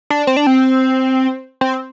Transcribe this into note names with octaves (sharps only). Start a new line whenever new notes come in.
D4
C4
D4
C4
C4